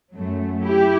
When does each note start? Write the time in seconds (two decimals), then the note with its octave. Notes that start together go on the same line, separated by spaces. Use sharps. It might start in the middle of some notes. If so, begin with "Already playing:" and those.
0.14 F#2 F#3 A3
0.63 E4 G4